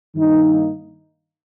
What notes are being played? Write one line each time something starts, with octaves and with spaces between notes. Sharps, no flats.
G2 D#3 A#3 D#4